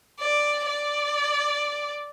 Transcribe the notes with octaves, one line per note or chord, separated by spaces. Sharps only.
D5
D5